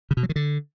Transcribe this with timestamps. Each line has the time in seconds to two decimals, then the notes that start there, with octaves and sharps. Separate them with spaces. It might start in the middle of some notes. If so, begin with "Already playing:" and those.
0.11 C#3
0.17 B2
0.23 F#3
0.29 D#3
0.36 D3